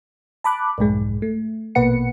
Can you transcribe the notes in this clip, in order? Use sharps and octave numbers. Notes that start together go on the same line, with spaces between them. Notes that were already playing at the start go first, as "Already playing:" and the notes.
A5 B5 D6 F#6
B1 F2 G#2 G#3
A3
A#1 B2 A#3 B4 F#5 C#7